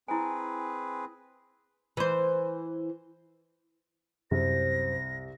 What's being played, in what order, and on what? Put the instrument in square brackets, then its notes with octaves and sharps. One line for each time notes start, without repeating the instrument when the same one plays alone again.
[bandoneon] C4 G#4 B4 [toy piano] E4 G#5
[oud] E3 C5
[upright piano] C2 [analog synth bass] F#2 [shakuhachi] C5 [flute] A#6